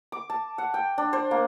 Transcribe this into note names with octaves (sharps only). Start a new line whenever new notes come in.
D6
A5
F#5
G5
D4
C5
A#3